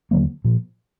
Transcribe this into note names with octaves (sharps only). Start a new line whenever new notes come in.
D#2 D3 F#3 A#3
A#2 F3